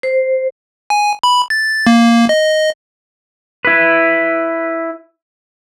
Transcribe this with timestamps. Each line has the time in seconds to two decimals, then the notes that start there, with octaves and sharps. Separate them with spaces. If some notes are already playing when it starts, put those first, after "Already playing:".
0.03 C5
0.90 G#5
1.23 B5
1.50 A6
1.87 A#3
2.29 D#5
3.65 E4 B4